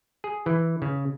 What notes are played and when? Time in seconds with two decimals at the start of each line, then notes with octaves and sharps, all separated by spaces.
0.24 G#4
0.46 E3
0.82 C#3